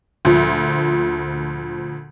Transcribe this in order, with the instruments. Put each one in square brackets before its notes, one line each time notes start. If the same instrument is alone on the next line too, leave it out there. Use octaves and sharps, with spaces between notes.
[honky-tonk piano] D2 A#2 F3